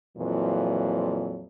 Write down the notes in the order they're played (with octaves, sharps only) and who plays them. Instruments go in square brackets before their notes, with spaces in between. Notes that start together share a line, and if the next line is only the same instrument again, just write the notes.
[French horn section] F2 A#2 E3 F#3